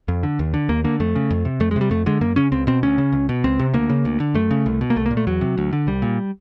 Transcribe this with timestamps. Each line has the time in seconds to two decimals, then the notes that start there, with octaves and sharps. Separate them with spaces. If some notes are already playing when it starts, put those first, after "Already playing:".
0.08 F2
0.23 D3
0.39 D#2
0.54 D3
0.69 D#2 A#3
0.84 D3 A#3
1.00 F2 A3
1.15 C#3
1.31 F2
1.45 C3
1.60 F2 A3
1.71 G#3
1.76 C3 G3
1.91 F2 A3
2.06 D3 G#3
2.21 F#2 A#3
2.36 C#3 C#4
2.52 C#2 C4
2.67 B2 C4
2.83 D2 C#4
2.98 C#3
3.12 C#2
3.29 B2
3.44 C#2 C4
3.59 C3
3.74 D2 A#3
3.90 C#3
4.05 D2
4.20 D3
4.34 F#2 A3
4.51 C#3
4.66 C2
4.81 B2
4.90 A#3
4.96 C2 A3
5.06 A#3
5.11 A#2
5.17 A3
5.27 E2 F#3
5.41 C3
5.58 D2
5.73 D3
5.87 C2 G3
6.02 A#2